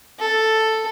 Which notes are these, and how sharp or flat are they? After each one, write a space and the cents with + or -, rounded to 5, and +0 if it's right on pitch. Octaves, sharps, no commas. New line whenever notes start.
A4 +5